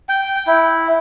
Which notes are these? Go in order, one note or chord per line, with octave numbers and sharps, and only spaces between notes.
G5
E4